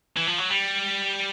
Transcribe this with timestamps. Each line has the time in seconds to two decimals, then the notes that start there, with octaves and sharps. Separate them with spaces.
0.17 E3
0.27 F3
0.39 F#3
0.50 G3